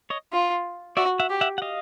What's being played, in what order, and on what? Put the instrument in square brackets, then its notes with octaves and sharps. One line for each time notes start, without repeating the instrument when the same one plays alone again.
[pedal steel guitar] C#5 D#5
[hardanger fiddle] F4
[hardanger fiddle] F#4 [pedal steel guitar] D5 E5
[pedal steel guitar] E5 F#5
[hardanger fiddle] G4
[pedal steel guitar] E5 F#5
F#5
D#5 F5